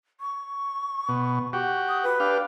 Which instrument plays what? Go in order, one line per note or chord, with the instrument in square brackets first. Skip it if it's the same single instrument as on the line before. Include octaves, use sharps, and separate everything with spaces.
[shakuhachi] C#6
[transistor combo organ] B2
F#4 G4
[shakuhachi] D#6
B4
[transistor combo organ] D4 G4 F5